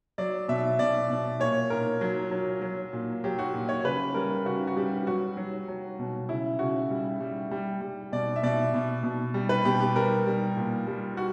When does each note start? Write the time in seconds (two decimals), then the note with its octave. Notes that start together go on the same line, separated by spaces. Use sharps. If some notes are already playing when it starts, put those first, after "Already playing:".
0.18 F#3 D5
0.48 B2 E5
0.79 B2 D5
1.10 B2
1.40 A#2 C#5
1.70 A#2 A#4
2.01 F#3
2.31 F#3
2.62 F#3
2.93 A#2
3.24 F#3 G4
3.38 F#4
3.53 A#2
3.69 C#5
3.84 C#3 B4
4.14 G3 A#4
4.45 C#3 F#4
4.67 F#4
4.76 G3 G4
5.07 F#3 F#4
5.37 F#3
5.68 F#3
5.99 B2
6.29 C#3 E4
6.59 C#3 F#4
6.91 G3
7.20 G3
7.51 G3
7.81 G3
8.12 B2 D5
8.36 E5
8.43 B2 D5
8.74 B2
9.03 B2
9.34 G3
9.49 B4
9.65 B2 G4
9.80 G4
9.96 G3 A#4
10.27 G3
10.57 A#2
10.87 G3
11.17 F#4